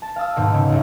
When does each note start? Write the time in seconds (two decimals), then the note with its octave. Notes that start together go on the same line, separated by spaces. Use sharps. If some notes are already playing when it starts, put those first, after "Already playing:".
0.02 A5
0.16 F5 A5 D#6 E6
0.36 D#2 G#2 B2
0.54 C#3
0.69 F#1 B1